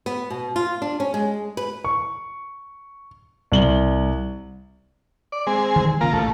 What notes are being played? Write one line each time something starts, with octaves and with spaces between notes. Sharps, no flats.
B3
B2
F4
D4
C#4
G#3
B4
C#6
C2 F#7 G7
D5
G#3 C4 G#4
D#3 E3 G3
C#3 A#3 F4 A#4
A1 A3